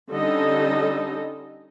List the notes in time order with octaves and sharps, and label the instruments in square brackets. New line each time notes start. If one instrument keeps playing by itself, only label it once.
[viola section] D3 G3 C#4 D#4 A4 D#5